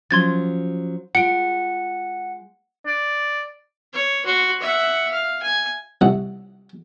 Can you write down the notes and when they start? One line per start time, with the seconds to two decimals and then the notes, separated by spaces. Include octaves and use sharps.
0.11 F3 F#3 C#4 C6 G#6 A6
1.15 G#3 F4 F#5 C#7 D7
2.86 D5
3.93 C#5
4.25 F#4 C6
4.60 E5 F#5
5.11 F5
5.42 G#5
6.01 C2 F#5